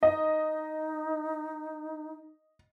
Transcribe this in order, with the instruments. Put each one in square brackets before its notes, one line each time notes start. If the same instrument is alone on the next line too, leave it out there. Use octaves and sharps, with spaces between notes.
[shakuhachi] D#4 [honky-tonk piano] D#5